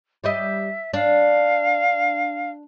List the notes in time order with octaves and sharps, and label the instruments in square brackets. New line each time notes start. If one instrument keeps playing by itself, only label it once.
[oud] G3 G4 D#5 [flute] E5
[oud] D4 [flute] F5